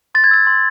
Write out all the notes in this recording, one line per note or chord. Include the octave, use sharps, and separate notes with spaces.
C6 A6
G#6
E6 A6
C6